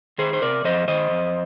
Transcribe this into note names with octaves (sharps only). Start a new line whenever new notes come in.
D#3 G#4 C5
C5
C3 A#4 D5
F2 C5 D#5
D#3 C5 D#5
F2